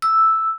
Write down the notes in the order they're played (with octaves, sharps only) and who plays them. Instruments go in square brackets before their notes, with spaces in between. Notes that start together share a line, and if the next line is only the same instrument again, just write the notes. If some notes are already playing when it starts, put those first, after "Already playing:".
[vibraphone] E6